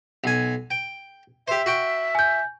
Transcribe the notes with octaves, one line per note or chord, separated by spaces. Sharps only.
B1 G#5
G5
G4 C5 E5
F#4 G5
G#5 G6